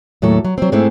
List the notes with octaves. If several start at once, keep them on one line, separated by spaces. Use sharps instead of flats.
D#2 A2 F#3 A4
F#3
F#3 C4
G#2 G#3 A3 C4 E4